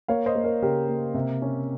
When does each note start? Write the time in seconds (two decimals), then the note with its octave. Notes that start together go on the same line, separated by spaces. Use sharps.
0.08 A#3 C#5 F5
0.26 C5 D#5
0.35 A#3
0.44 A#4 C#5
0.62 C#3 G4 A#4
0.88 A#3
1.14 C3
1.42 C#4